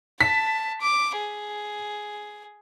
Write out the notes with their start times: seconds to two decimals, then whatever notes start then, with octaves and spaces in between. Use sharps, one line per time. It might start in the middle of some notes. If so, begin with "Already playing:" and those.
0.21 A5 B6
0.81 D6
1.18 G#4